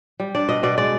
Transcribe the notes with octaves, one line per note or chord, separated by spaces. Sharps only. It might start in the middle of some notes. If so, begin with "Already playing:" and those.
G3
D4 D5
B2 D#5
B2 D5
G#3 D5